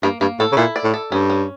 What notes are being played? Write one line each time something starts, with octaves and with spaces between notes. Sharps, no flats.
G2 A#3
G2 A#3
A2 A4
C#3
A#2 E4
D5
A2
A4
G2 C#4
C#4